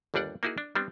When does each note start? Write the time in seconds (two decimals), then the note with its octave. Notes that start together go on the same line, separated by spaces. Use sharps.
0.14 G1 D#2 G3 D4 D5 F#5
0.43 A#3 D#4 E4 F#4 G#4
0.58 D4
0.75 G3 B3 C4 D4